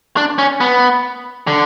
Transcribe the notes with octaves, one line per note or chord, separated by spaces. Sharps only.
D4
C#4
B3
D3